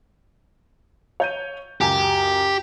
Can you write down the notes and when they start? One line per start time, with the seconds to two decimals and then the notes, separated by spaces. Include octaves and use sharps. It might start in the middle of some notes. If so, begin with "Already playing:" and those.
1.20 C#5 G6 D#7
1.81 C#2 F#2 G4 G#5